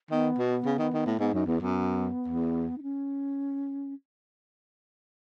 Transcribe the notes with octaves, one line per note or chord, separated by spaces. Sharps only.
D#3 B3
B2
C#3
D#3
D#3
A2
G#2 B3
F#2 D#4
E2 B3
F#2 B3
E2
D#4
C#4